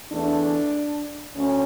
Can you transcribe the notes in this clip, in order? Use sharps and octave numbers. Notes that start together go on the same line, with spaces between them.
E2 E3 A3 D4
D2 C#4